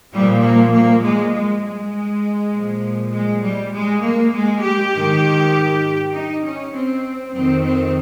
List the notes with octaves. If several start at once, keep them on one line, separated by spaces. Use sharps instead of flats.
A#2 F3 G3
A#3
A#3
G#3
G#3
G#3
A#2 F3
G#3
G3
G#3
A#3
G#3
G4
G#2 D#3
D#4
C#4
C4
F2 D#3 C4
C4